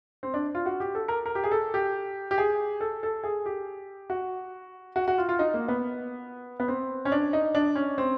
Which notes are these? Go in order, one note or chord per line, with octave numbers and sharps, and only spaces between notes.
C4
D4
F4
F#4
G4
A4
A#4
A#4
G4
G#4
A4
G4
G4
G#4
A4
A4
G#4
G4
F#4
F#4
F#4
F4
F4
D#4
A#3
B3
B3
C4
C#4
D4
D#4
D4
C#4
C4